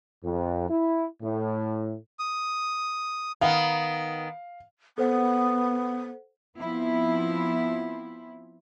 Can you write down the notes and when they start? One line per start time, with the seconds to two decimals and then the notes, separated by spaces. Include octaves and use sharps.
0.24 F2
0.70 E4
1.22 A2
2.19 D#6
3.41 D#3 B3 F5
4.98 B3 A4 C5 F#5
6.57 F3 B3 C4 E4